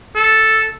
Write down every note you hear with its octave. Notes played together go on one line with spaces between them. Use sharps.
A4